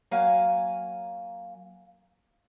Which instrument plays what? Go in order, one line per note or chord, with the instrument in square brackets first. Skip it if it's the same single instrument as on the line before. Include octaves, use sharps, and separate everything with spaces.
[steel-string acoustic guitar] F#3 A#3 F5 G#5